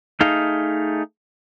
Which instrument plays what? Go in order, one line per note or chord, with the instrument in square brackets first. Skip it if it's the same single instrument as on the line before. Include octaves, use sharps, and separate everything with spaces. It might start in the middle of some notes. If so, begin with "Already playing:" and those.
[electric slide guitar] A3 D#4 G#4 F5